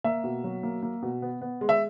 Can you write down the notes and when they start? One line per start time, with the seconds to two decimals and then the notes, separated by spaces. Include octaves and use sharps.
0.04 A#3 E5
0.24 B2
0.44 F#3
0.63 A#3
0.83 A#3
1.02 B2
1.22 B3
1.41 B3
1.61 G#3
1.69 E5